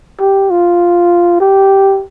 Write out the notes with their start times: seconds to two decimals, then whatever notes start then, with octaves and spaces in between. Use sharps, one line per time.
0.20 G4
0.50 F4
1.40 G4